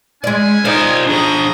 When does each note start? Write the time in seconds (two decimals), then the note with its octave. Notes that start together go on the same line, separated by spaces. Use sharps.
0.24 G#3 C#4 E4 D5 G#5
0.65 D#4 F4 C5 D5
1.07 D4 G#4 A#5 D#6